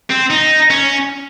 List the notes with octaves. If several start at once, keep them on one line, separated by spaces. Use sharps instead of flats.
C4
D#4
C#4